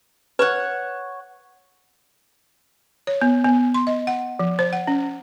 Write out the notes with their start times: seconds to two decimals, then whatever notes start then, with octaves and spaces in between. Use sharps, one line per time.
0.39 B4 C#5 F#5
3.07 C#5
3.21 B3
3.44 B3
3.74 C6
3.87 D#5
4.07 F#5
4.39 F3
4.59 C5
4.73 F#5
4.87 C#4